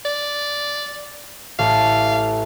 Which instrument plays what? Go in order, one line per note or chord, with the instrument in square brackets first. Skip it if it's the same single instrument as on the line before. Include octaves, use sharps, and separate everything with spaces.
[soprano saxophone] D5
[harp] A1 A4 [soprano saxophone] F5